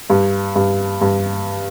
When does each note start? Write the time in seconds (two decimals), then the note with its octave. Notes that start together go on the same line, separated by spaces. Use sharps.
0.10 G2
0.55 G2
1.01 G2